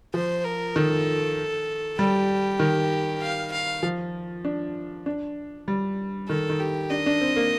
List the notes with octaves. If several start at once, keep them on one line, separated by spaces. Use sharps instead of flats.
F3 C5
A#4
D#3 A4
G3 G4
D#3
F5
F5
F3
D4
D4
G3
D#3 A4
D#3
G4
D4 D#5
D4
C4
A#3